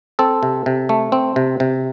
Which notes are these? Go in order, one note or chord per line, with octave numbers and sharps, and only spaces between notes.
C4 A4
C3
C3
A3
C4
C3
C3